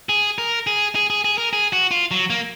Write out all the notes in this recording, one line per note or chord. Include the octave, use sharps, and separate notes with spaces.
G#4
A#4
G#4
G#4
G#4
G#4
A#4
G#4
F#4
F4
F#3
A#3